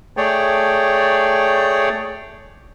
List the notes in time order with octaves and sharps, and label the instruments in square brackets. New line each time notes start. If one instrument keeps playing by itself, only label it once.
[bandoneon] A3 G#4 C#5 D5 G5